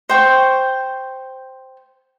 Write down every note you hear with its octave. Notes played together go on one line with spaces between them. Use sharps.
C5 G5 C#6